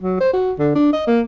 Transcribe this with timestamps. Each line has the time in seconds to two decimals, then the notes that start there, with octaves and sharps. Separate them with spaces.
0.01 F#3
0.21 C5
0.33 F#4
0.58 D3
0.75 D4
0.93 D#5
1.07 A#3